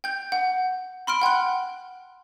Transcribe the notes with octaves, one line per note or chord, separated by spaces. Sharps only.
G5 G6
F#5
B5 C6 F6 D7
F#5 G5 C6 F#6